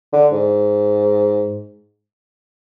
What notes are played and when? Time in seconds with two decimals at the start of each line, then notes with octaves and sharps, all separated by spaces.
0.13 D3
0.32 G#2